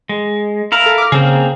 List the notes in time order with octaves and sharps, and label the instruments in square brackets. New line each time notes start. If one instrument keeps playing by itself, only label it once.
[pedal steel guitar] G#3
E4 A#4 F5
[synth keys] A4
D6 F6
[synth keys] C#3 [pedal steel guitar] A#3 C4 G#4